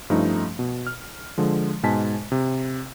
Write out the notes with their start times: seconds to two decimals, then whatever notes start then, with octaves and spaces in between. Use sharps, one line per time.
0.10 G2 F3 A3 C#4 D#4 F4
0.59 B2
0.87 F6
1.38 D3 F3 G#3
1.83 G#2 B2 G#3 G#5 A5 B6
2.32 C3